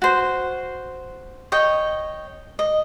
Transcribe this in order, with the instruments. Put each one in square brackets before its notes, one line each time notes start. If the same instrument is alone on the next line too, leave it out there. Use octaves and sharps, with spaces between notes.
[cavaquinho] F#4 C5
C#5 D#5 G5
D#5